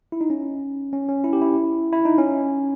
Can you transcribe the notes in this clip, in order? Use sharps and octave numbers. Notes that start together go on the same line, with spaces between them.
E4
D#4
C#4
C#4
C#4
E4
G4
E4
E4
D#4
C#4